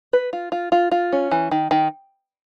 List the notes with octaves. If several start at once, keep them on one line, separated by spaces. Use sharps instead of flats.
B4
F4
F4
F4
F4
C#4
E3
D#3
D#3